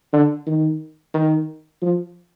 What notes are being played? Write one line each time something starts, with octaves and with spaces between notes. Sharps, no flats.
D3
D#3
D#3
F3